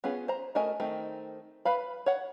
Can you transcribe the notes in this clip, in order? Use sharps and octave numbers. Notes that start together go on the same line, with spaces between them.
B3 C#4 F4 G#4
C5 A#5
A3 F#4 A#4 D#5 G#5
D#3 A3 C4 D#4
B4 F5 B5
C#5 F#5